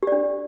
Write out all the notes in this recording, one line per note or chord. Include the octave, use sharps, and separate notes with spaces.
D4 G4 D5